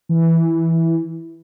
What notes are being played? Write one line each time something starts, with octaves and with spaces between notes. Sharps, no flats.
E3